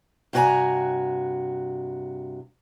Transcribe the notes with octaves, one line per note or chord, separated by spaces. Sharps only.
G2 C3 F#4 B4 G#5 A#5